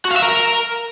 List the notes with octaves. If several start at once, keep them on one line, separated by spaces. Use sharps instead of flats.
F#4
F5
E5
A#4